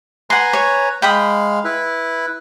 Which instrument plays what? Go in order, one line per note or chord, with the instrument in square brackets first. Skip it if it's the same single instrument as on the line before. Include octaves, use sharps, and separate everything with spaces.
[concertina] B4 G#5 A#5 [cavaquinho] F#5 C6
[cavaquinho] C#5
[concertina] G#3 F5 [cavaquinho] G5 B5 D#6
[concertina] E4 B4